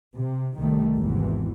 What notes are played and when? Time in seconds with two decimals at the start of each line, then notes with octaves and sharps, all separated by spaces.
0.19 C3
0.56 C2 D#3 G3 A3
0.97 G#1 E2 C3 E3